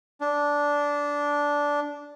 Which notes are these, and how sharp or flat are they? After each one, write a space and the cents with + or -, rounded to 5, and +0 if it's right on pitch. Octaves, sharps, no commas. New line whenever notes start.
D4 -10